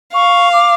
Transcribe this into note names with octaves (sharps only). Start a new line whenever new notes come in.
F5 C#6
D6